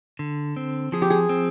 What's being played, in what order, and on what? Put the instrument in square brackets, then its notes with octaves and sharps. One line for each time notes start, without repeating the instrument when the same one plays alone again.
[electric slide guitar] D3
C4
[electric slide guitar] F3 [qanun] G#4
[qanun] G4
G#4
[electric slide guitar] C4